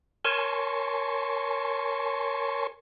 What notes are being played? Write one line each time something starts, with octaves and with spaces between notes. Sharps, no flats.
A#4 C#5 G#5 A5 C6 C#6